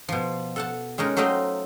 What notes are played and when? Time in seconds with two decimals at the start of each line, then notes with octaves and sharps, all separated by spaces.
0.08 B2 F3
0.56 A4 F#5 A5
0.98 G#3 C#4 D#4 A#4
1.17 F#3 A3 C5 D#5 F5 G5